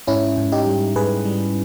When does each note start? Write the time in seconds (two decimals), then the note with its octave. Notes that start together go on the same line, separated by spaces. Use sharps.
0.07 G#2 C#4 E4
0.37 G#2
0.52 D#4 G4
0.67 G3
0.96 G#2 G#4 B4
1.25 G3